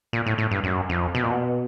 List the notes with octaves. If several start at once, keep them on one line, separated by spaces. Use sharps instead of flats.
A#2
A2
A2
G2
F#2
F2
B2
A#2
B2